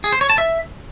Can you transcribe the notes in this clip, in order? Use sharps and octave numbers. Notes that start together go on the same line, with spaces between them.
G#4
C5
C#5
A5
E5